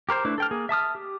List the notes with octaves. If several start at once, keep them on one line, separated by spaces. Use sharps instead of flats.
G4 A#4 C5 G6
A3 D4 E4 B4
A4 G5 F6
A#3 G#4
E5 A5 D#6 F6
G4